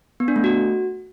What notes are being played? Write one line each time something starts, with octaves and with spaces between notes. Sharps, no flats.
B3
D4
A3
F#4